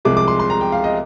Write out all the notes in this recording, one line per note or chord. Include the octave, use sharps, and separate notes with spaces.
C2 C3 F3 G#3 D6
D6
C6
C6
A#5
G5
F5
D#5